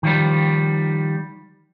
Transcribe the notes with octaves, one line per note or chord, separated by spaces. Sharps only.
D#3 F3 G3